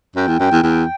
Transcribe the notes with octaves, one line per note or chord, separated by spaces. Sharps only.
F#2 G5
E2
F#2 G5
E2
E2 G5